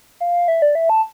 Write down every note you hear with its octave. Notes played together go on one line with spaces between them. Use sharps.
F5
E5
D5
E5
A5